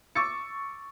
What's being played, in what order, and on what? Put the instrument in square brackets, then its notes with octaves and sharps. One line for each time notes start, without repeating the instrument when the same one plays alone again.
[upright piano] C#6 D6 E6 A6 C#7